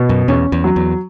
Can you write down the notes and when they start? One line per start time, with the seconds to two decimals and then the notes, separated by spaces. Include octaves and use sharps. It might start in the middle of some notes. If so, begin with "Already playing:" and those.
Already playing: B2
0.09 F#2
0.28 E2 C#4
0.52 E2
0.64 F#3
0.76 E2